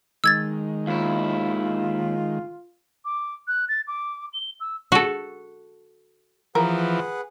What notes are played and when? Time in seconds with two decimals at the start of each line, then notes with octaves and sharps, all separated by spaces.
0.24 D#3 G#3 E6 G#6 A6
0.87 D#2 E4 F4
3.05 D6
3.48 F#6
3.69 A6
3.88 D6
4.33 G7
4.60 E6
4.92 F#4 A4
6.55 E3 F3 G#4 A#4 B4 F#5